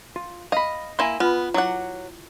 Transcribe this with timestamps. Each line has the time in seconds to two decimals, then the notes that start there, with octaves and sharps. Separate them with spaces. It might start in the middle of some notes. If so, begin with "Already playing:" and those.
0.16 F4
0.52 D#5 F5 B5
0.99 A#3 E4 E5 G#5 C6
1.20 B3 F4 B4
1.54 F#3 E4 F#5 D6